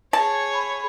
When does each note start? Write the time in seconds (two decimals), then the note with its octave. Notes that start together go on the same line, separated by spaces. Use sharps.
0.13 G#4 C#5 A5
0.56 B5